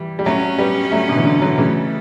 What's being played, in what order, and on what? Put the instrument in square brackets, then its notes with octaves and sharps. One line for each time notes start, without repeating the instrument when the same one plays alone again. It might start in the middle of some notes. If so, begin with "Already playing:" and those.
Already playing: [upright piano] E3 G3
G3
[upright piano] F#3 A3 [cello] C#4
[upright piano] G3 B3
F#3 A3
B2 D3
E3
D3 F#3
D3 F#3
[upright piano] C#3 E3 [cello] A3